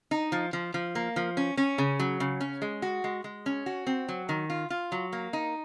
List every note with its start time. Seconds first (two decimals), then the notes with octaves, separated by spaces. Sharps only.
0.11 D#4
0.32 F3
0.53 F3
0.74 F3
0.95 A#3
1.16 F3
1.37 C#4
1.57 C#4
1.78 C#3
2.00 F#3
2.20 C#3
2.41 C#4
2.62 G#3
2.82 F#4
3.04 G#3
3.24 G#3
3.46 C#4
3.66 F#4
3.87 C4
4.09 F#3
4.29 D#3
4.50 F4
4.70 F4
4.92 F#3
5.13 A#3
5.33 D#4